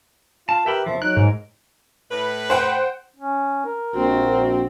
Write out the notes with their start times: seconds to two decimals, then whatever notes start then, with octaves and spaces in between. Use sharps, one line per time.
0.49 F4 F5 A5
0.66 G4 A#4 B4 E5 G5 B5
0.86 E2 C#3 F3 E5
1.02 F#3 D#4 A#4 F#6
1.17 G#2
2.11 A2 B4
2.50 C5 F#5 G5
3.16 C#4
3.66 A#4
3.95 A#1 C4 F#4